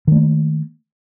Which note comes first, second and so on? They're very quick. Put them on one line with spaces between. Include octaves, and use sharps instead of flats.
D#3 A3 A#3